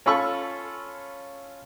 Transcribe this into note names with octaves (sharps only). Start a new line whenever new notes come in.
C#4 F4 A4 B5 C#6 E6